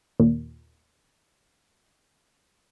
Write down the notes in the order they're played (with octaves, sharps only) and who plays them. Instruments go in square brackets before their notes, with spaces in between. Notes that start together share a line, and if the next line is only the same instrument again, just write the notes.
[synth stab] D#2 A#2